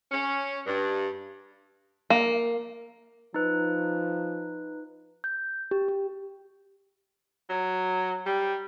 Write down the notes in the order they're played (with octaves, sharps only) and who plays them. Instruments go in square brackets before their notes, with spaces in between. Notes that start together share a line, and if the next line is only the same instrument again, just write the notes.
[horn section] C#4
G2
[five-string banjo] A#3
[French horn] F3 [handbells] D#4 B4
[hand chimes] G6
G4
G4
[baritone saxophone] F#3
G3